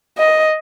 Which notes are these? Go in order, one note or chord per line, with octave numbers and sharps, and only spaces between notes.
D#5